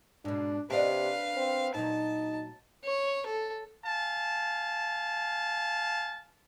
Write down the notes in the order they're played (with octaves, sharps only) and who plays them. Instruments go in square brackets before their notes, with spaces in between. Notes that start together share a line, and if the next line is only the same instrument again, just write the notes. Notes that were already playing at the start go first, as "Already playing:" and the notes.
[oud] G#2 B2 [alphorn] D4
[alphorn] C3 [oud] D4 D5 D#5 [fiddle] B4 F5
[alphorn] C4
[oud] A#2 F#3 [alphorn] D#4 [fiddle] A5
[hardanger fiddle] C#5
A4
[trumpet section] F5 G#5 A5